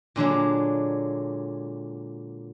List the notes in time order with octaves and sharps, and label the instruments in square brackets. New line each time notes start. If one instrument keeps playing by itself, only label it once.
[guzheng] A#2 D3 F#3 G#3